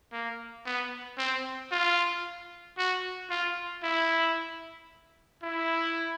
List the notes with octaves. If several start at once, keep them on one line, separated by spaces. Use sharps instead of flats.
A#3
B3
C4
F4
F#4
F4
E4
E4